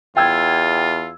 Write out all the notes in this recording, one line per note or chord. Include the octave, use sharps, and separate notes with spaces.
E2 F4 G5 E6 G#6